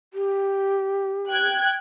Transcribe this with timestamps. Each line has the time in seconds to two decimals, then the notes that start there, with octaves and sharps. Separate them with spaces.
0.14 G4
1.30 G5 F#6 G#6